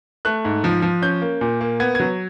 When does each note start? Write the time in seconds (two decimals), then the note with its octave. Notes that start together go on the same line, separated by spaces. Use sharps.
0.25 A3 F#6
0.45 G#2
0.64 F3
0.82 F3
1.02 C#4 G6
1.22 A#3
1.41 A#2
1.61 A#3
1.80 B3 G#6
1.95 F#3 G#6